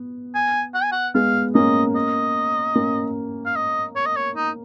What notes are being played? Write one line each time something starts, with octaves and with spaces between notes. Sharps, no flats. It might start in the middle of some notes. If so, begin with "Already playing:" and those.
Already playing: B3
G#5
F#5
G#5
F#5
G#3 B3 F5
A#3 C#4 D#5
D#5
A#3 C#4
F5
D#5
C#5
D#5
C#5
D#4